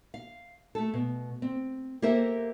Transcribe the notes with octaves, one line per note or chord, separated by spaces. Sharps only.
F5
A3 A4
B2
C4
A#3 G4 A4 A#4 C5 E5